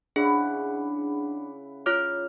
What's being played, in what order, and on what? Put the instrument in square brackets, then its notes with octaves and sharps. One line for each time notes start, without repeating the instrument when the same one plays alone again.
[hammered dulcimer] C#3 E4 F#5 [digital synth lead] D4 [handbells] G#4
[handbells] F4 C#5 D6 [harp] F6